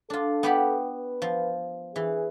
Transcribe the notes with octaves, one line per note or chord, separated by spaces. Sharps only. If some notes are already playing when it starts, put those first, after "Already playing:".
D4 F4 A4
B3 G4 B5
B4
F3
E3 G#4